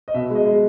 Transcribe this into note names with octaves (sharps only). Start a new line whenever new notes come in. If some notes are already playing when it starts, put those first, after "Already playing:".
D#5
B2 E5
G#3
D#5
G#3